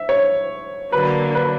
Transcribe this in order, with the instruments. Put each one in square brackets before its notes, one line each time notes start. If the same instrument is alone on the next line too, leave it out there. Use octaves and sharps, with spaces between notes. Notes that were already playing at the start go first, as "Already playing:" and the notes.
Already playing: [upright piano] E5
C#5
[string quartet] D3 F#3 A#3 [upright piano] B4
[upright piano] B4